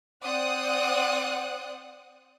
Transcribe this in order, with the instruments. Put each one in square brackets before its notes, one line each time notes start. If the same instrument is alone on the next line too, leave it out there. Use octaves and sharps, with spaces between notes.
[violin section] C4 C5 D5 F#5 D#6 F#6